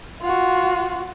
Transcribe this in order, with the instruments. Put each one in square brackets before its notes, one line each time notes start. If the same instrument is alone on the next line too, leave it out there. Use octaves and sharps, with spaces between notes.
[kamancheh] F4 F#4